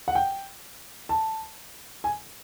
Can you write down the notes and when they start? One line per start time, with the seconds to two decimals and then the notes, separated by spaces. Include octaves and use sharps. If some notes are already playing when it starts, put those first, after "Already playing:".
0.08 F#5
0.15 G5
1.09 A5
2.04 G#5